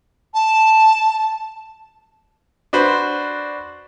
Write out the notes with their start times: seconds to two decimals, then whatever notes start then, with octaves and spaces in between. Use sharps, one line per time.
0.34 A5
2.73 D4 F#4 B4 C5